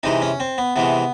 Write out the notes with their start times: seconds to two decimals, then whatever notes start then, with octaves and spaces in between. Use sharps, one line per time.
0.03 C3 E3 G#3 D#4
0.22 C#4
0.40 C4
0.58 B3
0.76 C3 E3 G#3 B3